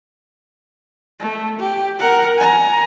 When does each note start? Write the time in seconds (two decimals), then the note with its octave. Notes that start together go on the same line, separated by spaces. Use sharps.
1.20 A3
1.59 G4
1.99 A#4 F#5
2.37 G#5 A#5